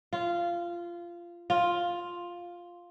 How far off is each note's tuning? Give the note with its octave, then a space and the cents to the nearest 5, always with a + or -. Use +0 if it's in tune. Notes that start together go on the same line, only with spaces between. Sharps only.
F4 -15
F4 +5